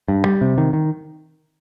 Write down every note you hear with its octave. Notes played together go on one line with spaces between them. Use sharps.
G2
G3
C3
D#3
D#3